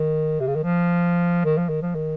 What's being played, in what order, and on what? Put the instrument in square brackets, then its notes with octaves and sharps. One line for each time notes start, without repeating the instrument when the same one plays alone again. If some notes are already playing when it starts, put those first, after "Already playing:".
Already playing: [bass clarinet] D#3
C3
C#3
D#3
F3
D#3
F3
D#3
F3
D#3